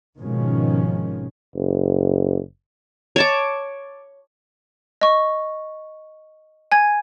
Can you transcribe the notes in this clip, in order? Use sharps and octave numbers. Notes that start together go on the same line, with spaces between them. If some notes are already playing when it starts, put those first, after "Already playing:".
G#1 B2 D#3 F3 G#3 C#4
F#1
C#5 A5 D6
D#5 C#6
G#5 G#6